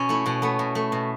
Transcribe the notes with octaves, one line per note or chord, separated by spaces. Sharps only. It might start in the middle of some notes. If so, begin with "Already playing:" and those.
Already playing: B2 C#4
A3 E4
B2 C#4
A3 B3
B2
A3
B2